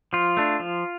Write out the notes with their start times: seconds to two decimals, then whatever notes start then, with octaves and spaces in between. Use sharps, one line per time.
0.13 F3 F4
0.37 A3 D4
0.60 F3